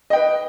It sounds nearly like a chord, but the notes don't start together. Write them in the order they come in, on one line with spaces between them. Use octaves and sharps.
D#5 G5 B4